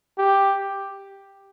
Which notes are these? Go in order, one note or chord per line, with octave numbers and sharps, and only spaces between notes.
G4